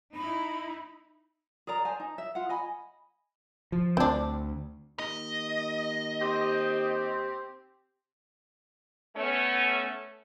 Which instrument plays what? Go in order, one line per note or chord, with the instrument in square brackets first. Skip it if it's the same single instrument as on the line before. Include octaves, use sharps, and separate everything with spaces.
[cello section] D#4 E4 [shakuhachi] B5
[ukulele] G#4 A#4 D5 A#5
C5 G#5 A5
D#4
E5
F4 F#5
D#5 G#5 B5
[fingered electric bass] F3
[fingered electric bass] D2 [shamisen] C4 D4
[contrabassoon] D#2 [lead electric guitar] D#5
[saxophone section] C4 G4
[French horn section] A3 B3 C#4